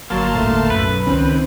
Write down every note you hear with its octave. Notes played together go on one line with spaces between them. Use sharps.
G1 F#3 A#3 A5 C6
D#1 G#1 A2 A3
B1 F#2 B4
C#2 D#3 C4 C#4